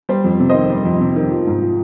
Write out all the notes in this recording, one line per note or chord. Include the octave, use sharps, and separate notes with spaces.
G3 C5
F2
C3
D#3 C5 D#5
G3
F2
C3
D#3
F3
G#2
F3